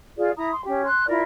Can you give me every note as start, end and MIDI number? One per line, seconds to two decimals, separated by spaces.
0.17 0.31 65
0.17 0.31 68
0.17 0.31 74
0.36 0.51 64
0.36 0.51 82
0.36 0.51 87
0.53 0.64 84
0.66 0.85 61
0.66 0.85 67
0.85 1.06 84
0.85 1.06 90
1.08 1.22 64
1.08 1.22 65
1.08 1.22 70
1.08 1.22 74